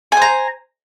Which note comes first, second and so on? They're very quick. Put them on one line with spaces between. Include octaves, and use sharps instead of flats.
G#5 C5 A#5